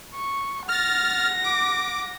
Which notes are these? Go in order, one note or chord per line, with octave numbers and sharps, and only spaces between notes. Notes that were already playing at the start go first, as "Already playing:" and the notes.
C#6
F#5 F6 A6 A#6
D6